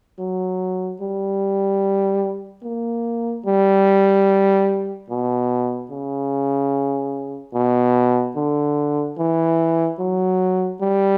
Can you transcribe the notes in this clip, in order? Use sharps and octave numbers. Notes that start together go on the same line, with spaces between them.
F#3
G3
A#3
G3
B2
C#3
B2
D3
E3
F#3
G3